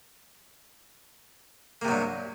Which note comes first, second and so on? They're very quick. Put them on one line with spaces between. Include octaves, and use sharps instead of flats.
A#3 C3 F#3 G2